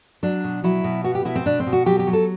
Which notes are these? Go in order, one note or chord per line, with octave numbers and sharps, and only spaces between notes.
F#3 D4
B2
F#3 E4
B2
B3 F#4
G4
B2 E4
C4
B2 D4
C4
B2
F#4
F#3 G4
G4
F#3
A4